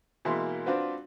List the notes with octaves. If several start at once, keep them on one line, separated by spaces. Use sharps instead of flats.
B2 E3 G#3 A#3 E5 C6
C4 D4 F4 F#4 B4 C5